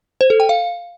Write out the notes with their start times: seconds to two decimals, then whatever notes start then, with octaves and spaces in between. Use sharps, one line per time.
0.21 C5
0.30 A4
0.40 G5
0.49 F5